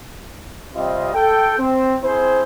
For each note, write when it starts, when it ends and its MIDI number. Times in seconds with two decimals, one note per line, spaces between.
0.75 1.09 48
0.75 1.09 55
0.75 1.09 60
0.75 1.09 65
0.75 1.09 75
1.14 1.56 69
1.14 1.56 79
1.59 1.96 60
2.03 2.43 60
2.03 2.43 64
2.03 2.43 68
2.03 2.43 72